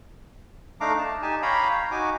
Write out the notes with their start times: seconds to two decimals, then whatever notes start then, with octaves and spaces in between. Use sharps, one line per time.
0.81 A3 D4 D#4 F5 A#5 D6
0.99 A5
1.22 D#4 G4 G#5 A5
1.42 C#5 F5 G5 A#5 B5
1.72 A#5
1.91 D#4 F#4 G#5 D6